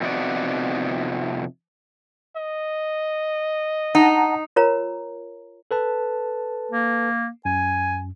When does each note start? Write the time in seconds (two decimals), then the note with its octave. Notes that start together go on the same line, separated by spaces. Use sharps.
0.01 F2 C3 B3 D#4 F#4 D5
2.36 D#5
3.95 D#4 F#5 A5 A#5
4.56 F4 A#4 C#5 A#5
5.71 A4 B4 A5
6.71 A#3
7.45 F#2 G#5